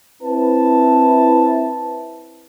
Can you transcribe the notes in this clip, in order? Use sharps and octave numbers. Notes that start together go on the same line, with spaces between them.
C4 E4 B4 A5